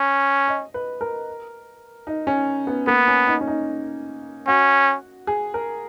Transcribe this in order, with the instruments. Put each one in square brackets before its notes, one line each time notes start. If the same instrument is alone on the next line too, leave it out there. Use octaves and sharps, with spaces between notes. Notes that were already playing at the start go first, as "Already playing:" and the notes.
Already playing: [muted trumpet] C#4
[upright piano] D#5
B4
A#4
D#4
C#4
B3
[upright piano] A#3 [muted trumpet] B3
[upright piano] C#4
D#4
C#4
D#4
[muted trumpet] C#4 [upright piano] F#4
[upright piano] G#4
A#4